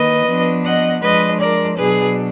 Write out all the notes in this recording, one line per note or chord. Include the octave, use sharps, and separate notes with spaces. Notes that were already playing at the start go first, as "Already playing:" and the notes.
Already playing: D#3 A#3 B4 D#5
F3 B3 D4
D#5 F#5
F3 G#3 D4 B4 D#5
A#4 D5
B2 F#3 D4 G#4 B4